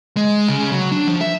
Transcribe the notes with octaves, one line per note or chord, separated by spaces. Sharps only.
G#3
C#3
F#3
D4
F3
E5